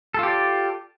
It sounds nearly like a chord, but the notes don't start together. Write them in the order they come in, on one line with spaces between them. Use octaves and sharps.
A4 F4 G4 D5